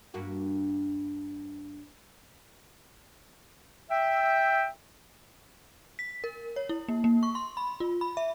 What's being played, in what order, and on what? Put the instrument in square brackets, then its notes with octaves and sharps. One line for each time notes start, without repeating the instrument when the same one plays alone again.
[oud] G2 A#3 F#4
[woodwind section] E5 G5
[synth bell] B6
A#4
C#5
E4
A#3
A#3
C#6
C6
B5
F4
B5
E5